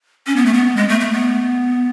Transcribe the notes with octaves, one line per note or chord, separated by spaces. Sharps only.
C#4
B3
A3
B3
G#3
A3
A3
B3